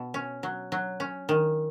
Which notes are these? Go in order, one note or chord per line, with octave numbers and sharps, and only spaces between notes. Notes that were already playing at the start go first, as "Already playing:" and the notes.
Already playing: B2
C#4
F#3
F#3
C#4
D#3